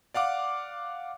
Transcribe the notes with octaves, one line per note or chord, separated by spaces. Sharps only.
D5 F5 F#5 D6